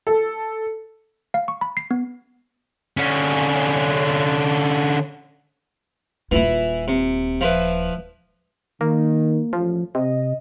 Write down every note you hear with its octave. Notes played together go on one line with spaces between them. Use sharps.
A4
F5
C#6
B5
C7
B3
D3 C#4
D#1 E3 E4 F4
C3
F3 E4 B4
D#3 A#3
A1 F3
C3 D#5